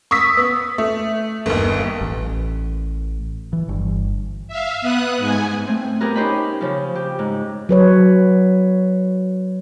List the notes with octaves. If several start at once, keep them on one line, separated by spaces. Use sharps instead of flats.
C#6 D#6 E6 B6
B3
A3
G1 D#2
A1
E3
G1
E5 F5
B3 D#6 F#6
G#2 G#5
A3 C4
B3 G4 G#4 A#4 B4
C#4 D#4 G4 C5 D#5 B5
C#3 F3
G4
G#2
F#3 B4 C#5